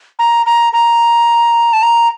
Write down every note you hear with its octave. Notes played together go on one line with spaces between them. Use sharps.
A#5
A#5
A#5
A5
A#5